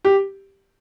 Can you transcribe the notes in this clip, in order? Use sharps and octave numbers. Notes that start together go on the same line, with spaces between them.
G4